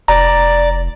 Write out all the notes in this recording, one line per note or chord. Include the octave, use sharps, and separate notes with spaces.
F1 D5 A#5